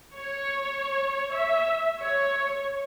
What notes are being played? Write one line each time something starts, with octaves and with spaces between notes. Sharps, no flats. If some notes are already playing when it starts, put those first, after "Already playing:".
C#5
E5
C#5